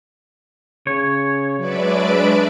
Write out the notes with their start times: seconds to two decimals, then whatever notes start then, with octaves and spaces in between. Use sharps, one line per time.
0.87 C#3 C#5
1.59 F#3 G#3 D4 B4 D5 E5 D7